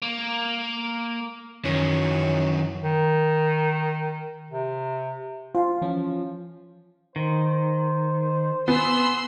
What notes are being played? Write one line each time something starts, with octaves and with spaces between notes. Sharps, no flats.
A#3
F#2 D#3 E3 C#4
D#3
C3
F4 C5 F5
E3 F3 C#4
D#3 C5
B3 G#5 B5 C6 E6